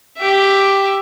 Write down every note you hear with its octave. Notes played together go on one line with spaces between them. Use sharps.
G4 E5